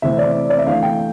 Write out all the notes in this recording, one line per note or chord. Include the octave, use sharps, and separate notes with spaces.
C3 E3 A3 C4 E5
D5
D5
E5
E3 A3 D4 F5
G5